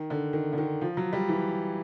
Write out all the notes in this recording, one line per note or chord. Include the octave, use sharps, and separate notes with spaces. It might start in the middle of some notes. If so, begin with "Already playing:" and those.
Already playing: D#3
D3
D#3
D3
D#3
F3
F#3
G3
E3